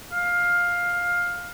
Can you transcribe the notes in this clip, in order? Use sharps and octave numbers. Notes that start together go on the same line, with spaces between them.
F5